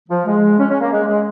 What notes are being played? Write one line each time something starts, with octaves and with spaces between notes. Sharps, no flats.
F3
G#3
C#4
C#4
A#3
G#3
G#3